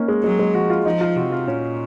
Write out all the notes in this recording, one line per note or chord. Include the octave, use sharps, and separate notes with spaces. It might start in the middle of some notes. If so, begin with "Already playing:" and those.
Already playing: A#3 C#4 D#4
G#3
F#3 G#3
G#3
F3 F#4
F4
F3 D#4
F4
C3 F#4
F4
A#2 C#4